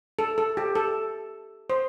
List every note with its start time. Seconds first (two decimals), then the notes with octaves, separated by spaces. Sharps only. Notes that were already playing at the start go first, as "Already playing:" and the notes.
0.19 A4
0.38 A4
0.57 G4
0.75 A4
1.70 C5